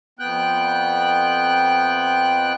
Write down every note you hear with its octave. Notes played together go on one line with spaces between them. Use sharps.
F2 B3 G5 F#6